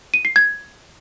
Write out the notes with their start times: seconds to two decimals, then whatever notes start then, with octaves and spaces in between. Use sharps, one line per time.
0.14 D#7
0.25 C7
0.36 G#6